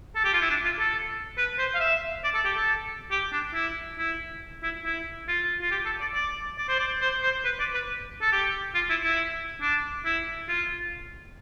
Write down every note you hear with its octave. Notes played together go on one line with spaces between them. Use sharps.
A4
G4
F4
E4
D4
F4
A4
B4
C5
F5
E5
D5
A4
G4
A4
G4
D4
E4
E4
E4
E4
F4
F4
G4
A4
D5
D5
D5
C5
D5
C5
C5
B4
D5
B4
A4
G4
F4
E4
E4
D4
E4
F4